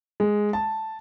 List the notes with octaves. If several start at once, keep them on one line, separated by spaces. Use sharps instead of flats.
G#3
A5